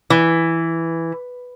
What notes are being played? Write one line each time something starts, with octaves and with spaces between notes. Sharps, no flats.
E3